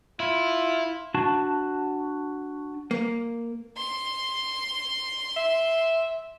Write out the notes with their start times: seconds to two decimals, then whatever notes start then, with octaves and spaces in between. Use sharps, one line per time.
0.20 E4 F4
1.14 D4 F#4 A5
2.91 A#3
3.77 C6
5.36 E5